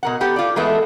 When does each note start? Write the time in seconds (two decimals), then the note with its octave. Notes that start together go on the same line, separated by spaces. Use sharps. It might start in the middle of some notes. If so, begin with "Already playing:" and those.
0.03 B2 A#4 F#5
0.21 B3 G4 A4
0.36 F4 D5
0.56 E3 G#3 A3 B3 A4